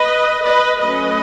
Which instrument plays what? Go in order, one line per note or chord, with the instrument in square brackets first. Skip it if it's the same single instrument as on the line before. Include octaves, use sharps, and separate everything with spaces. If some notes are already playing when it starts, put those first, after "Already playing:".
Already playing: [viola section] B4 D#5
B4 D#5
F#3 A3 C#4 B4 D#5